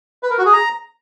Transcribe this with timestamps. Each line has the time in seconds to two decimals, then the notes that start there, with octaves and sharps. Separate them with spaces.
0.23 B4
0.31 A#4
0.38 F#4
0.46 G#4
0.53 A#5